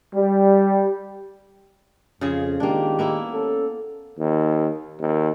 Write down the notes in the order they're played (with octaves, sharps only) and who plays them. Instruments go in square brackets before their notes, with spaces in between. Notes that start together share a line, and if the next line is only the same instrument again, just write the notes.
[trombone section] G3
[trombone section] F2 [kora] C#3 F4 G#4
[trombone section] D#3 G#3 G4 [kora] A#3 D4
[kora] A#3 B3 E4
[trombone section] C#4 A4
[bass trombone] D#2
D#2